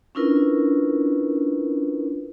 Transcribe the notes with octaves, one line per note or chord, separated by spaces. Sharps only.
C#4 D4 E4 F4 A#4 B4